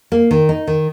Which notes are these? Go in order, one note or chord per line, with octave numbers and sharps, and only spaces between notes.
A#3
D#3
D#4
D#3